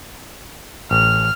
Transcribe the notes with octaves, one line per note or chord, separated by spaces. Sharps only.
A1 F6